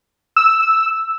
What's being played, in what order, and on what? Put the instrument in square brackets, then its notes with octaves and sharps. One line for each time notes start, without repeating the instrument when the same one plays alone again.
[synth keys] E6